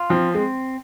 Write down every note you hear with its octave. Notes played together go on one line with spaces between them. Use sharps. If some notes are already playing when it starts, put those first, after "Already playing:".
Already playing: F4
F3 C4
G#3 C4